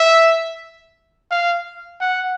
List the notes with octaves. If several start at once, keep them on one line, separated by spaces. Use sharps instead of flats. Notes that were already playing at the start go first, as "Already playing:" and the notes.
Already playing: E5
F5
F#5